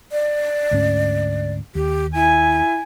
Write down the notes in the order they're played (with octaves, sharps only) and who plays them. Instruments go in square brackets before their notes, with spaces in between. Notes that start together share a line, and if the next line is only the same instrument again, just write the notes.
[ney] D5
[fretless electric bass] D2 G#2 C#4
[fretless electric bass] D#2 [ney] G4
[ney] E4 [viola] G#5